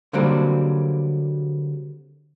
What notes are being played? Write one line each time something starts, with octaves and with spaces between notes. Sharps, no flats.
D3 F#3 G3 A#3 C4